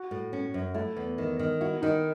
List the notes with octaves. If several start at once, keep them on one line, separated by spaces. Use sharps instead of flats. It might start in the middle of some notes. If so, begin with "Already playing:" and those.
Already playing: F#4
A2
C#4
F#2
A3 E4
E2
D#3
D#3
E4 F#4
D#3 D#4